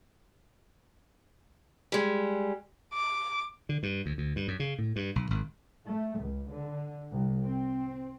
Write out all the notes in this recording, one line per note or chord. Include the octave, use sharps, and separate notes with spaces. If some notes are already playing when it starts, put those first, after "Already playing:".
G3 G#3
D6
D3
G2
D2
D2
G2
F#2
C#3
A2
G2
B1
G#1
A3
C#2
D3
C2
C4